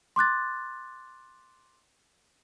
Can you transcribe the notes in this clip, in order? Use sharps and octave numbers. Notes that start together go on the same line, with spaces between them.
C6 D6 F#6 A6